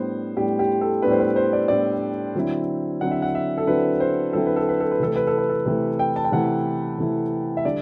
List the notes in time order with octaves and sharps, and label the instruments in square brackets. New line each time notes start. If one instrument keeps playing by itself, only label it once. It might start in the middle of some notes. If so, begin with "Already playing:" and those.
Already playing: [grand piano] A2 G3 B3 D4 C5
A2 G3 B3 D4 G4
G4
A4
A2 G3 B3 D4 B4
C5
B4
C5
D5
A2 G3 B3 D4 D5
D3 F#3 C4 E4
D3 F#3 C4 E4 F#5
E5
F#5
E5
A4
D3 F#3 C4 E4 B4
C5
D3 F#3 C4 E4 A4
B4
A4
B4
A4
B4
C3 E3 A3 E4 A4
B4
A4
B4
A4
C3 E3 A3 E4
G5
A5
G5
C3 E3 A3 E4 F#5
C3 E3 A3 E4
E5
D3 G3 D4 D5